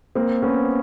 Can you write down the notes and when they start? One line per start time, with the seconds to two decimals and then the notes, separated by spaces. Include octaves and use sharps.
0.15 A#3 C4
0.42 B3 C#4